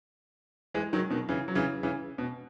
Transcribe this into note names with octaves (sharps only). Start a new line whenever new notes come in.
E3 G#3
D#3 F#3
B2 D#3
C#3 E3
F#3
C#3 E3
C#3 E3
B2